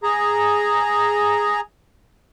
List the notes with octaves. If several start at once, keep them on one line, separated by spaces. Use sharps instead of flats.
G#4 A#5